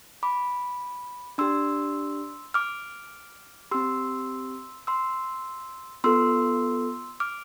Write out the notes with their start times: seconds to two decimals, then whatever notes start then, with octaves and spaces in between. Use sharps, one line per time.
0.23 B5 D6
1.38 D4 G4 C6 E6
2.54 D6 F6
3.71 C4 G4 C6 E6
4.87 C6 E6
6.04 B3 F4 A4 C6 E6
7.20 D6 F6